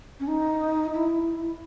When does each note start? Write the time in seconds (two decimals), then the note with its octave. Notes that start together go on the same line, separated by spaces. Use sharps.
0.20 C#4
0.28 D#4
0.94 E4